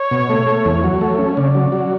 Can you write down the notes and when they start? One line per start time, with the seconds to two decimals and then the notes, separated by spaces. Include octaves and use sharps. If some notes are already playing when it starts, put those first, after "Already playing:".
Already playing: C#5
0.11 B2
0.29 A3
0.47 A3
0.65 E2
0.83 F#3 C#5
1.01 A3
1.18 C#4
1.37 C#3 D5
1.55 F#3
1.72 F#3